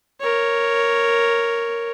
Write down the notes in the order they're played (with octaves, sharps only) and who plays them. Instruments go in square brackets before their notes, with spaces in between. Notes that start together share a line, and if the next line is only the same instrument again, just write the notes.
[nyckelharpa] A#4 C#5